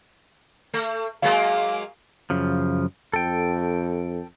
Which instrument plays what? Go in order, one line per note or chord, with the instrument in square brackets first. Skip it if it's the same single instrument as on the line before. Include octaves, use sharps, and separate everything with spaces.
[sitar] A3
[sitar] F#3 G#3 A#3 [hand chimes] F5
[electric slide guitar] F#2 C#3 F3
[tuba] F2 [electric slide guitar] A4 G5